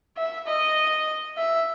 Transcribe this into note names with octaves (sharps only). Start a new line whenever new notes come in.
E5
D#5
E5